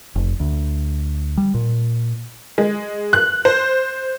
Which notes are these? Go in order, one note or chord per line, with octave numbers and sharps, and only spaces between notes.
F1
D2
G3
A#2
G#3
F#6
C5